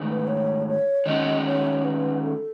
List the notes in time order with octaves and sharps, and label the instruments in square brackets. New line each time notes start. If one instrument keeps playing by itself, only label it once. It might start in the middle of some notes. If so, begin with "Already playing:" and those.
Already playing: [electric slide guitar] G#2 D#3 A3
[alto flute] B4
C#5
C#5
[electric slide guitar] D#3 G#3 C#4 F#4 [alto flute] D#5
[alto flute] C#5
B4
A4